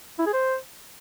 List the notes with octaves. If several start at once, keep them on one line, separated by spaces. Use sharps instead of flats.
E4
G#4
C5